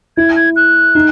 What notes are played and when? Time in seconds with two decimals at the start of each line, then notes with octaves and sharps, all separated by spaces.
0.17 E4 G#6
0.36 G#6
0.56 F#6
0.95 D#4